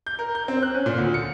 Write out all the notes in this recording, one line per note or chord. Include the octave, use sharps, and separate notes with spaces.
G6
A#4
G6
C4
F#6
C#4
A#2
D2
C#7